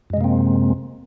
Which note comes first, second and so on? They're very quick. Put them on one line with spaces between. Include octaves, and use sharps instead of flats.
F#2 G#3 C3 A#3 C4